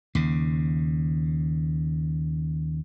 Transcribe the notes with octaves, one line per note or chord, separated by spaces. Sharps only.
D#2 C#3